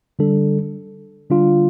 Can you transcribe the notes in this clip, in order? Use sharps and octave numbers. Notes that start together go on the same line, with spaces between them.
D3 G3 D4 A4
D3 G3 D4 F4